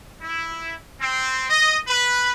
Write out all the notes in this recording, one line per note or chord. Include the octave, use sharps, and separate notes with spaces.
E4
C4
D#5
B4